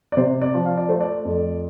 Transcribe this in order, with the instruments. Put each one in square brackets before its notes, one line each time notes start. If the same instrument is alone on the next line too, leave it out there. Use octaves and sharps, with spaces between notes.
[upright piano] D5
C3 C5
D5
F3
F5
D5
A3 C5
D5
F2